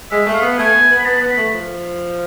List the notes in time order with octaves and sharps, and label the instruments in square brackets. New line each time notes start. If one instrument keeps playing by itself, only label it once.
[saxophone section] G#3 [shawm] E5
[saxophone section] A3
[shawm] F5
[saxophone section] B3
[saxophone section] A3 [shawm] G#5
[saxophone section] B3
B3
[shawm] B5
[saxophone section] B3 [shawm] A5
[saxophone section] B3
[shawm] B5
[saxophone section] A3
F3